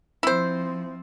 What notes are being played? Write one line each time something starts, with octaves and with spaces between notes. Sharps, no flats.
F3 C4 E4 C5